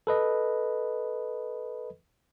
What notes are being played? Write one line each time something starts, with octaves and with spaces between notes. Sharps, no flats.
A4 B4 D#5